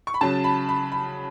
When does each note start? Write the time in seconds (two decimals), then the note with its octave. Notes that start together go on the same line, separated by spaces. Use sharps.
0.07 C#6
0.14 B5
0.21 C#3 F#3 A5
0.44 B5
0.69 B5
0.92 B5